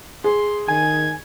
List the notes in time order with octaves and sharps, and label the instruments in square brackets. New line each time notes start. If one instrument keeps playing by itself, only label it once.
[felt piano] G#4 [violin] C6
[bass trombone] D#3 [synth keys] G#5 [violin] G#6